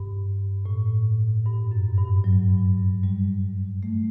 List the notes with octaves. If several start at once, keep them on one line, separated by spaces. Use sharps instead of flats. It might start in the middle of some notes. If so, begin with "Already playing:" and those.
Already playing: G2
A2
G2
F#2
G2
F#3
G3
A3